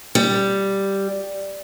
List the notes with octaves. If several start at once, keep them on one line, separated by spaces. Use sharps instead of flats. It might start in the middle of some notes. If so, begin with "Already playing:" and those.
G3